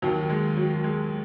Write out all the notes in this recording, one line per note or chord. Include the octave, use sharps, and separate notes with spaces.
D#2 D#3 F#3
G#3
F#3
G#3